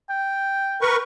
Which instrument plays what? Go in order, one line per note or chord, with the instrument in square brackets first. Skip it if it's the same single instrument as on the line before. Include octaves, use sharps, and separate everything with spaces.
[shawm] G5
[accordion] A#4 B4 C#6